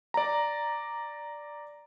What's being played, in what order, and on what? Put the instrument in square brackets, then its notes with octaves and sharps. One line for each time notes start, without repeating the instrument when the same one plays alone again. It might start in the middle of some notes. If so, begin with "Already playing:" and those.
[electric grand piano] D5 A#5